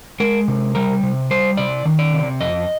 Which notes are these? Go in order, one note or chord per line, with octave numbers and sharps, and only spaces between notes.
G#3 A#4
C3
G3 A#4
C3
G3 C5
C3 D5
D#3
D5
C3
F2 D#5